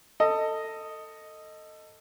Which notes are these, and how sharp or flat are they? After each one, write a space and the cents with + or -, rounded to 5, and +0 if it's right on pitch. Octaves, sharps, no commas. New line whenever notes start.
A4 +20 D#5 +0